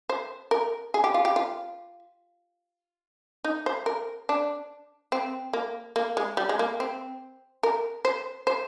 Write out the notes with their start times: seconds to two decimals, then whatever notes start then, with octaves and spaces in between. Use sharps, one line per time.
0.09 C5
0.51 A#4
0.94 G#4
1.04 G4
1.14 F4
1.25 G4
1.36 F4
3.44 D#4
3.66 C5
3.86 A#4
4.29 D4
5.12 C4
5.53 A#3
5.96 A#3
6.17 G#3
6.37 G3
6.49 G#3
6.59 A#3
6.80 C4
7.63 A#4
8.05 C5
8.47 C5